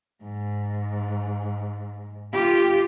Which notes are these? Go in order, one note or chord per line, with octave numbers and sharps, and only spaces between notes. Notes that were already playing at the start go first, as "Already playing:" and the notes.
G#2
F4 G4